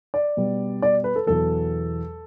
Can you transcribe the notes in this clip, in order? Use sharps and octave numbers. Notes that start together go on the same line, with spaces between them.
D5
B2 G3
D5
B4
A4
E2 B2 F#3 A4